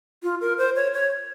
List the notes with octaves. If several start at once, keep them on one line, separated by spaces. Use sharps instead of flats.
F4
A#4
C5
C#5
C#5